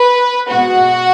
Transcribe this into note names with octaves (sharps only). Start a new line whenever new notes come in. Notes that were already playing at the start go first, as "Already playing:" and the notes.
Already playing: B4
B2 G#3 B3 F#4 F#5